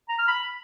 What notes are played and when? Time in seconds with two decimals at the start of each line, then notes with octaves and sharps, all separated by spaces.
0.09 A#5
0.18 F6
0.28 B5